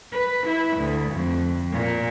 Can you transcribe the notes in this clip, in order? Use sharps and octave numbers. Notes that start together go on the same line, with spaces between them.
B4
E4
D2
F2
A#2